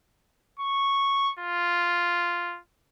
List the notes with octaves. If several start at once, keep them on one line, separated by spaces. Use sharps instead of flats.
C#6
F4